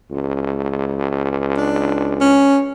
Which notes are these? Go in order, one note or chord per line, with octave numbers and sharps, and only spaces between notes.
C#2
D4
C#4